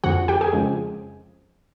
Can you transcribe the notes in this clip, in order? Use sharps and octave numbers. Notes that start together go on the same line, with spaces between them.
F2 D3 F3 F#4 F#5
G4 G5
G#4 G#5
F2 C#3 F3 G#3